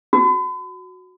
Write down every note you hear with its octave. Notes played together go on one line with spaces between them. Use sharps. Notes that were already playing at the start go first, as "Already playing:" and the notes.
F#4